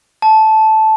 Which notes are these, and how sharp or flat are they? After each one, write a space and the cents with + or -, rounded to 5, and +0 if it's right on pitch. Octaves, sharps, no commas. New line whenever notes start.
A5 -10